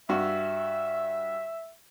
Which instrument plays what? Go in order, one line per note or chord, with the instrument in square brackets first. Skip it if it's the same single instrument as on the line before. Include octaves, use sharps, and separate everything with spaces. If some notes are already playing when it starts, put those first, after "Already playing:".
[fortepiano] G2 F#4 [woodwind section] E5